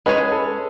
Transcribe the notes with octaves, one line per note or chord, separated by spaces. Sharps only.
G#3 C#4 G#4 B4 C#5
A4